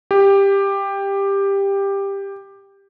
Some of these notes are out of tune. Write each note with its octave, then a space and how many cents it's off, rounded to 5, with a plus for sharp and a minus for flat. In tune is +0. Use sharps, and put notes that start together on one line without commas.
G4 +10